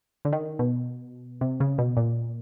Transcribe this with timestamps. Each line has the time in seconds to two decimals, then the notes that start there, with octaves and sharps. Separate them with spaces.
0.25 D3
0.33 D#3
0.59 B2
1.41 C3
1.60 C#3
1.78 B2
1.97 A#2